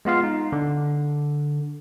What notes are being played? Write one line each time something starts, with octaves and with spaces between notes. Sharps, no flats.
G#3 B3 F4 F5
D#4
D3